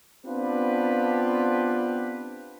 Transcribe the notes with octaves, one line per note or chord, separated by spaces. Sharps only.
B3 C4 D4 F4 G4 B4